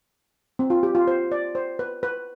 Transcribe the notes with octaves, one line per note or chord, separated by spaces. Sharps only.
C4
F4
G4
F4
C5
D5
C5
B4
B4